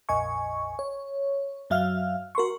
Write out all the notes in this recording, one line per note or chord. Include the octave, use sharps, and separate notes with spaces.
A#1 F2 D#5 G#5 C#6
C#5
F#2 F#3 E5 F5 F6
F#4 A#4 C6 C#6